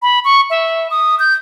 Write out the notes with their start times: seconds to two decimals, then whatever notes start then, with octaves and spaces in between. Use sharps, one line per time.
0.02 B5
0.25 C#6
0.50 E5
0.91 D#6
1.19 G6